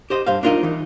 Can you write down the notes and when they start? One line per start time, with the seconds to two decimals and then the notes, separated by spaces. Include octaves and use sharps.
0.10 G4 C5 D#5
0.27 G2 C5 F5
0.43 D4 D#4 F4 A#4 D#5
0.63 E3 D#4